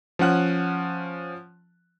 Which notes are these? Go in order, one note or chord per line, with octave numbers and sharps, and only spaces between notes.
F3 C#4 F#5 F#6